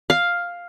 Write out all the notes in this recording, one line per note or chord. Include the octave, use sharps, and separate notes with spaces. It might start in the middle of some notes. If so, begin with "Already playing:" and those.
F5